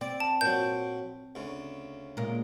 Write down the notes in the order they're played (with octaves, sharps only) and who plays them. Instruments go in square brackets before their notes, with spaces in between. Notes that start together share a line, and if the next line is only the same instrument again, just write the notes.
[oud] C4 [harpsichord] D5
[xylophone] A5
[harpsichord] A#2 F#3 [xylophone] G6
[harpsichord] D2 C#3
[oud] A#2 G#3 A#4